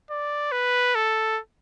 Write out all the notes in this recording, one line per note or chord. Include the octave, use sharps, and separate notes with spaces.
D5
B4
A4